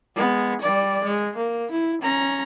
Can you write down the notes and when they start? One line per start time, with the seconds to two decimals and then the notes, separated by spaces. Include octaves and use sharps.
0.16 G#3 B3
0.61 G3 D5
1.04 G#3
1.37 A#3
1.71 E4
2.02 C#4 A#5